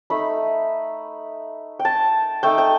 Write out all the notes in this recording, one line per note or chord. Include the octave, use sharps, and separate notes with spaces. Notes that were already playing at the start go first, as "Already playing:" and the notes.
A3 D#4 B5
G5
A5
A3 D#4 G5
G5